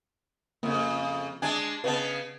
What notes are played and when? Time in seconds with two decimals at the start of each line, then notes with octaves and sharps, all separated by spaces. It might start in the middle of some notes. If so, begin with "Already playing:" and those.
0.63 F2 C#3 A#3
1.42 G#3 D4 G#5
1.84 C#3 B3 B4 D#5 A5